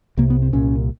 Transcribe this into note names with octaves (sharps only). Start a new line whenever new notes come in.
C2 C3 A#3
B3
C4
C2 A#2 C#4